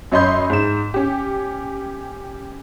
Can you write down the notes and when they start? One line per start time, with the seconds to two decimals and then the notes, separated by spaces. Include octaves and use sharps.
0.12 F#2 C#5 D#5 B5 C6 G6
0.50 G#2 E7
0.94 C#4 G4